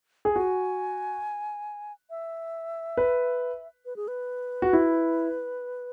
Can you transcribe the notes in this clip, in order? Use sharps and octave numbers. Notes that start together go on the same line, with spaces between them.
G#4
F#4 G#5
E5
B4
B4
G#4
B4
F#4
E4